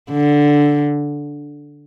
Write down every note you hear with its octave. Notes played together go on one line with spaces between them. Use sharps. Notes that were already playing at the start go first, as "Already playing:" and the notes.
D3